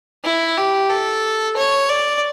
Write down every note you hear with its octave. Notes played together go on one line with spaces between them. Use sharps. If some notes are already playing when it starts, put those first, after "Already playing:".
E4
G4
A4
C#5
D5